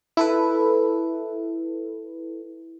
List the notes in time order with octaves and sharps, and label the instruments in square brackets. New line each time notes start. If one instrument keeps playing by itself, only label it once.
[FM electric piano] E4 A4 B4